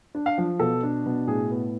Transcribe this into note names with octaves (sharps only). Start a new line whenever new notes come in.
D4
F5
F3
B2 A4
D4
B2
A2 G#4
B3